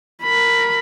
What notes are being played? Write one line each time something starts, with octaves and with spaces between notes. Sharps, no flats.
A#4 B5